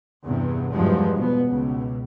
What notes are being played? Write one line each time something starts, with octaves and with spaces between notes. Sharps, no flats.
E2 G2 C3
E2 G2 F3 F#3 G#3
B2 B3
C#2 B2